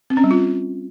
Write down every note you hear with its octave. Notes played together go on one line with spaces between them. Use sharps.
C4
C#4
G3
F4